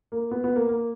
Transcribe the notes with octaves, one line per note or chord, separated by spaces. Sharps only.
A#3
B3
B3
A#3
A#3